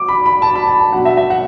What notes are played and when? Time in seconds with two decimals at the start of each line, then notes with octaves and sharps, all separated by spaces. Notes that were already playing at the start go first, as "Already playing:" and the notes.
Already playing: D6
0.08 B5
0.26 B5
0.42 A5
0.55 B5
0.67 A5
0.80 A5
0.92 B2 F#3 D4 F#5
1.05 E5
1.17 E5
1.30 F#5